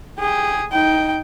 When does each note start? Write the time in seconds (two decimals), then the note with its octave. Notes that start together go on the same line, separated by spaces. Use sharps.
0.19 G4 G#4
0.72 D#4 G5